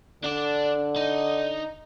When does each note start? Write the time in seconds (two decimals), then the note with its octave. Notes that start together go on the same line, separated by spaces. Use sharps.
0.24 D3 D4 D5
0.96 D#4